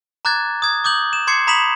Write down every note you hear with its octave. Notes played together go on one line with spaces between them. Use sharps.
A#5 D6 F#6 G#6 A6
D#6 G#6
D6 D#6 G6 F#7
E7
C6 D6 G#6 C7 C#7
A#5 B5 D#6 B6 E7 F#7